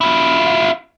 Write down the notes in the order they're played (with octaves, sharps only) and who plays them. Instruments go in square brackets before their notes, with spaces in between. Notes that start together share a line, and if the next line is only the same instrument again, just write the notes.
[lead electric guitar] E4 F4